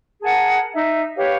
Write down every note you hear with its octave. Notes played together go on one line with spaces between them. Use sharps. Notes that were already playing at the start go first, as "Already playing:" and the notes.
G#4 A#4 F#5 A5
D#4 E5
G4 B4 C#5 F5